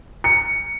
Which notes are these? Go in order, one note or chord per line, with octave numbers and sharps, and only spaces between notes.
C#7